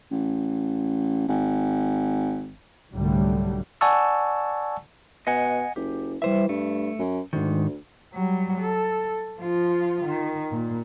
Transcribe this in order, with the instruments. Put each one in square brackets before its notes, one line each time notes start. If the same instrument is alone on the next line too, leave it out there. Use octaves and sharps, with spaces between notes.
[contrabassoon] A1
G#1
[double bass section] C2 G#2 D3 F#3 G3 A3
[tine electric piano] D5 F#5 G#5 A5 C#6 E6
[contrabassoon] B2 [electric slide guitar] D#5 F#5 G#5
[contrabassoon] F#1 [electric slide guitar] G4
[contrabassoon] E3 [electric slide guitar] G3 C5 E5
[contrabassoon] G2 [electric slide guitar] A3
[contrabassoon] F#2
[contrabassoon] D2 [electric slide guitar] G#2 D#3
[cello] F#3 G3
A4
F3 F4
D#3
A#2